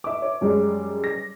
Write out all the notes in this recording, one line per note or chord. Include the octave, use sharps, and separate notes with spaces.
E5 D6
C#5
F#2 G3 G#3
A#6